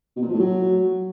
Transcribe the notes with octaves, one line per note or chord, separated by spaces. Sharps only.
B2
A#2
F3
A2
F#3